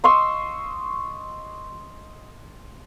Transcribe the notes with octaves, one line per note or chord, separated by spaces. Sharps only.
D#5 C6 C#6 E6